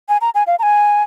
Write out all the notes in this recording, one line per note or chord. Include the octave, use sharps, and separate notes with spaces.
G#5
A#5
G#5
F5
A#5
G#5